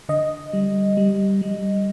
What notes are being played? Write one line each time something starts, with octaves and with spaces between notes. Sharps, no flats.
D3 D#5
G3
G3
G3